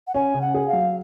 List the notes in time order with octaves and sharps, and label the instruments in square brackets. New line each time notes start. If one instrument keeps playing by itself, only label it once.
[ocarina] F#5
[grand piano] C#4 [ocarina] G#5
[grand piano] C#3
[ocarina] F#5
[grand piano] G#4
[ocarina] F5
[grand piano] F#3